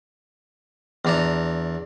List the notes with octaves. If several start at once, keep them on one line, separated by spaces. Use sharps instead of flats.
E2 D4 A#5